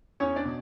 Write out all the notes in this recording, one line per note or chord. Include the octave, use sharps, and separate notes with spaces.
E2 C#4 C#5
D4 D5
B2